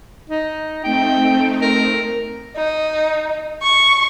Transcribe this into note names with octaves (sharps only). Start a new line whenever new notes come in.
D#4
A3 C4 D#4 G5
A#4
D#4
C#6